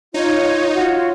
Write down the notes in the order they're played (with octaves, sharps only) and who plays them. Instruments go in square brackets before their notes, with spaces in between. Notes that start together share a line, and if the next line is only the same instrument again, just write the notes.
[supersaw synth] D#4 [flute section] F4 C#5
[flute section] F4 F#4 C#5